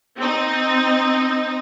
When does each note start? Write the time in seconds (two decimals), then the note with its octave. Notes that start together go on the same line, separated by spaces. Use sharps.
0.18 C4 D#4